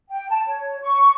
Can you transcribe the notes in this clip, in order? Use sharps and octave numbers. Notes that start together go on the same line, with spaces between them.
G5
A5
C#5
C#6